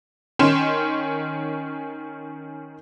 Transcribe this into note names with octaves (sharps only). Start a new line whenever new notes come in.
D#3 C#4 C6 E7